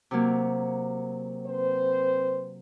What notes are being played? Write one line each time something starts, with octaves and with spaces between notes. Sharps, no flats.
C3 F#3 A#3
C4 B4 C5